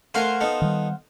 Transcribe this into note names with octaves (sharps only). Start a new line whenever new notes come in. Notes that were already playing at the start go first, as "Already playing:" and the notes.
A3 A#4 C5 F5 F#5 G#5
B3 D#4 A4
D#3 G3